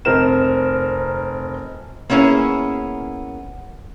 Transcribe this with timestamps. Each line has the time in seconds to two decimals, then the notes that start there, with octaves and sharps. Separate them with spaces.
0.05 F1 C4 A#4 E7
2.10 A#3 B3 C#4 E4 G#4